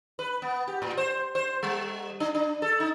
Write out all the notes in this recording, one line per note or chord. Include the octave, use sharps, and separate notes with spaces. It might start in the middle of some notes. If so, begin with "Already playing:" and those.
B4
B3
G4
A2
C5
C5
G3
D4
D4
A4
D#4